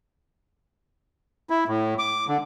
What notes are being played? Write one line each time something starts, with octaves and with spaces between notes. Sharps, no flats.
E4
A2
D6
D3